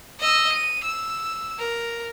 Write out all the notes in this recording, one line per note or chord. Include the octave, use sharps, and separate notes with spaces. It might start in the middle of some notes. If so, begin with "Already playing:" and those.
D#5 E6
D#7
E6
A#4